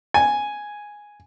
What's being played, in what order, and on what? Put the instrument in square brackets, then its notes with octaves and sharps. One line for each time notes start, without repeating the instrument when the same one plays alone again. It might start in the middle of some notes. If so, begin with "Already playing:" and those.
[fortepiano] G#5